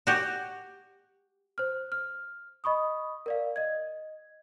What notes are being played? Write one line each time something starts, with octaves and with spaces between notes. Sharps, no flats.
F#4 G4
C5 F6
F6
D#5 B5 C#6 D#6
A#4 D5 F5
D#5 G#6